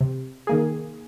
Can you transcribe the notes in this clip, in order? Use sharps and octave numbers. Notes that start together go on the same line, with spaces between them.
C3
D#3 A#3 G#4